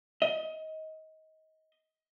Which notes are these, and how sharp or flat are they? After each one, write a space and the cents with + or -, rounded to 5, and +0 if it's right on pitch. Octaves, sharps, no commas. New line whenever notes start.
D#5 +25